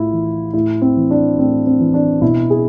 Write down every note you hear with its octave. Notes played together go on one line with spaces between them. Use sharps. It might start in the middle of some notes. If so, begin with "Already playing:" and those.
Already playing: A2 E4 F4
E3
A2 E4
C4
E3
D4
A2 C4
C4
E3
D4
B2 E4
G#4